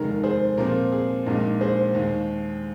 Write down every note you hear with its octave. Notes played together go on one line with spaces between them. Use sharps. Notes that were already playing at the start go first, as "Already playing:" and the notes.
Already playing: F1 D#2 D#3 G#3 A#4
G#4 C5
A#2 F3 C4 A#4
G#4
A#1 A#2 G#3 D#4 A#4
G#4 C5
D#2 D#3 G#3